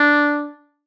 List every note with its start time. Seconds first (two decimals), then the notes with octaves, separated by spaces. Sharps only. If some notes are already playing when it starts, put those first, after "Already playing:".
Already playing: D4